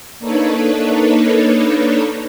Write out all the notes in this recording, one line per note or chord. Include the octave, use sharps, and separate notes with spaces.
A#3 D4 D#4 A4 B4 C#5